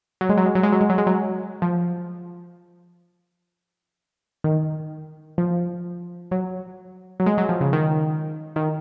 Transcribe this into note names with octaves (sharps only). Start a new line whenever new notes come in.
F#3
G#3
F#3
G#3
F#3
G#3
F#3
G#3
F#3
G#3
F#3
F3
D#3
F3
F#3
F#3
G#3
F#3
F3
C#3
D#3
D#3